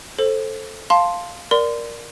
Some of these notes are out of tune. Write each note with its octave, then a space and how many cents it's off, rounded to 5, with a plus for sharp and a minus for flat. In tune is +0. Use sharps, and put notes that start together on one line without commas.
A4 +0 C5 +20
F5 +0 A5 +0 C6 +0
A#4 +10 D5 +0 C6 -30